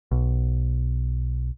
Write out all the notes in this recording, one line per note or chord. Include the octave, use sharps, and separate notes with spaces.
B1